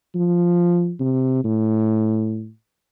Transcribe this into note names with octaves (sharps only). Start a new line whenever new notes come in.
F3
C3
A2